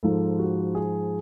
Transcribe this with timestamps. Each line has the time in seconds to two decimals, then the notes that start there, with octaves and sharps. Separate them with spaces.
0.03 G#2 F3 A4
0.39 F#4
0.75 G#4